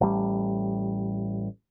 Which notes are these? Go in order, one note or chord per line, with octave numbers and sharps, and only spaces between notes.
A1 G3